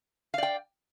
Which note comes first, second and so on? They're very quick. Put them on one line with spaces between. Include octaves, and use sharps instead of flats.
F5 D5 G5